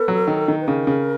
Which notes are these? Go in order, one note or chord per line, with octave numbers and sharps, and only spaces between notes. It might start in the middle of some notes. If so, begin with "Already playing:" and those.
Already playing: B3 A4
F#3
D#3
D#3
B4
C#3 A#4
C#3